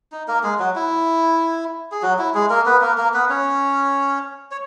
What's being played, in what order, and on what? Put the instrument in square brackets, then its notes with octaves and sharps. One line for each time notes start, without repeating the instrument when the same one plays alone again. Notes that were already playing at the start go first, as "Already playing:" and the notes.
[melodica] D#4
A#3 A#4
G#3 G#4
F#3 F#4
E4
G#4
F#3 F#4
E4
G#3 G#4
A#3 A#4
B3 B4
A#3 A#4
A#3 A#4
B3 B4
C#4 C#5
C#5